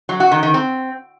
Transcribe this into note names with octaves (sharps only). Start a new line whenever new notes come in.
F#3
F#4
D#3
D#3
C4